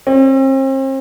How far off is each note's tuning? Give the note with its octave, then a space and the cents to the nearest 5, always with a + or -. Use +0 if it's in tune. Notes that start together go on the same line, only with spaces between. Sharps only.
C4 +40